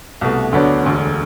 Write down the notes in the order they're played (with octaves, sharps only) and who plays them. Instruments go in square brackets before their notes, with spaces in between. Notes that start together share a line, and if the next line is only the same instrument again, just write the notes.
[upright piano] C2 B2 A3
D2 D3 F#3 B3 D4
E1 D2 D3